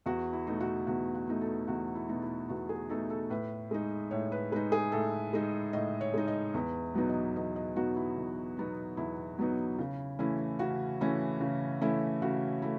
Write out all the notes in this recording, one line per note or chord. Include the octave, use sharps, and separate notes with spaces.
E2 F#4
E4
B2 A3 D#4
F#4
E2 F#4
F#4
B2 A3 D#4
A4
E2 F#4
E4
B2 A3 D#4
E4
E2 F#4
G#4
B2 A3 D#4 A4
A4
A2 B4
G#3 D#4
A2 C#5
B4
G#3 D#4 B4
G#4
A2 A4
G#3 D#4
A2 D#5
C#5
G#3 D#4
D#5
E2 B4
B2 F#3 B3 D#4
D#5
E2 D#5
D#5
B2 F#3 B3 D#4 F#4
E4
E2
B2 F#3 B3 D#4
E2 E4
B2 F#3 B3 D#4
C#3
E3 A3 C#4 E4
C#3 F#4
E3 A3 C#4 E4
C#3
E3 A3 C#4 E4
C#3 F#4
A3 E4